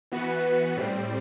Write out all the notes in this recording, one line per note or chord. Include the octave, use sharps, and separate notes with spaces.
E3 B3 F#4 B4
A2 G3 C4